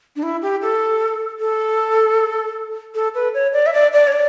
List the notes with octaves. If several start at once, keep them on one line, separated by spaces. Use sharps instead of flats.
D4
E4
G4
A4
A4
A4
B4
C#5
D5
E5
D5
D5
C#5
D5